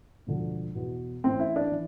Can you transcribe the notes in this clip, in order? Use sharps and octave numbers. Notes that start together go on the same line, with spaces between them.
E1 D2 D3 F3
E2 B2
A1 A2 E3 C4
E4
D4
E3